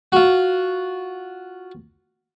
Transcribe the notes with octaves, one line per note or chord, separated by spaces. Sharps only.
F4 F#4